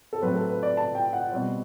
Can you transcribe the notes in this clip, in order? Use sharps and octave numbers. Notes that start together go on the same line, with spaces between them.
A4
A2 F#3 C4 B4
A4
B4
D5
A5
G5
F#5
B2 G3 C4